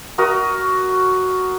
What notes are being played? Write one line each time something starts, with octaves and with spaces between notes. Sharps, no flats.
F#4 A#4 D#5